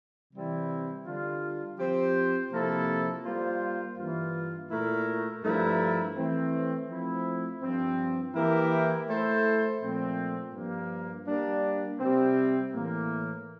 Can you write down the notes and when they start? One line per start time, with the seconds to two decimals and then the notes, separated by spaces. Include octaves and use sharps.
0.33 C3 E3 G3 C4 E4
1.06 D3 G3 D4 F4
1.79 F3 C4 G4 C5
2.51 C3 F3 A#3 E4 A4
3.25 G3 A#3 F4 C5
3.97 G2 E3 A#3 F4
4.71 A#2 A3 E4 A#4
5.43 G2 F3 A3 E4 A#4
6.16 E3 A3 C4
6.89 F3 A3 C4 E4
7.62 G2 F3 C4
8.35 E3 A#3 E4 G4 A#4
9.08 A3 E4 A4 C5
9.81 A#2 F3 A3 C4
10.54 G2 F3 A#3
11.27 G3 A#3 D4
11.99 C3 G3 C4
12.73 A2 E3 A#3